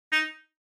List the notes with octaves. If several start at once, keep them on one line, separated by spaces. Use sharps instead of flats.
D#4